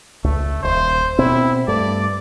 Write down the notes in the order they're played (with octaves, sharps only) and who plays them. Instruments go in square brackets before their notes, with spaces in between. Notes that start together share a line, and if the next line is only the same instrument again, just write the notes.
[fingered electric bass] C#2 [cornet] A3
[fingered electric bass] D#1 [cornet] C5
[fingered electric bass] B2 C4 [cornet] E4
[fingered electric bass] G2 A3 [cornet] D5